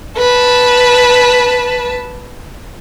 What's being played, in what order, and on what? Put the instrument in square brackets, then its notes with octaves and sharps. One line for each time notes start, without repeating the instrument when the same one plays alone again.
[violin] B4 A5